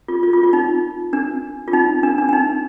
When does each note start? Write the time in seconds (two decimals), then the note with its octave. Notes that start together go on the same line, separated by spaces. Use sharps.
0.08 F4
0.23 F4
0.33 F4
0.43 F4
0.53 D#4
1.13 D4
1.68 F4
1.73 D#4
2.03 D4
2.18 D4
2.29 D4
2.33 D#4